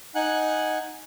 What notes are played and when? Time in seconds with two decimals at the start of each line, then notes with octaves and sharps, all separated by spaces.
0.15 D#4 F#5 G#5 F#6